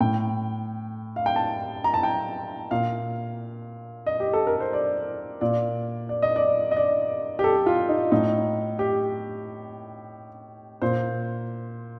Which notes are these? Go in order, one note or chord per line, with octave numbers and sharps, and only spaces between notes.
A2 G5
F5
G5
A5
A#5
A5
G5
A#2 F5
D#5
G4
A4
A#4
C5
D5
A#2 D5
D5
D#5
D5
D#5
D5
G4
A4
F4
D#4
A2 D#4
G4
A#2 C5